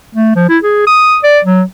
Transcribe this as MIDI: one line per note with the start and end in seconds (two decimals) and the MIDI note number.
0.15 0.34 57
0.35 0.45 53
0.49 0.58 64
0.63 0.84 68
0.87 1.18 87
1.23 1.39 74
1.44 1.62 54